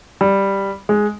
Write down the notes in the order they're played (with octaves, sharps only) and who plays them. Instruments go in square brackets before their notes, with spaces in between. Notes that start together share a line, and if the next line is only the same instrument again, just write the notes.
[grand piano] G3
G#3